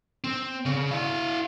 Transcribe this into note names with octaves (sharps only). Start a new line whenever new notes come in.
C4
C#3
E4 F5